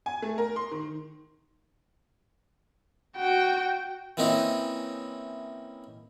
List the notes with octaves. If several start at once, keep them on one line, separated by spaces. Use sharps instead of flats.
G#5
A3
A#4
C6
D#3
F#4 G5
E3 A#3 C4 C#4 D#4 E4